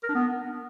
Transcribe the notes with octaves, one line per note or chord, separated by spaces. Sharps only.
A#4
D4
B3